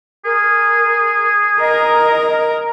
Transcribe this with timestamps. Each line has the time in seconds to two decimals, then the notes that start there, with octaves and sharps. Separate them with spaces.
0.25 G#4 A#4
1.60 A#4 D#5